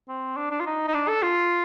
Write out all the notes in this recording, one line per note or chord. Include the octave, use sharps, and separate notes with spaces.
C4
D4
D4
F4
D#4
D#4
D4
A4
F4